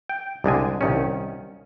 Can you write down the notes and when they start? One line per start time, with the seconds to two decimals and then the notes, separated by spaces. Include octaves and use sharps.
0.09 G5
0.44 C2 D3 G#3 G#5
0.81 C2 D#3 C#4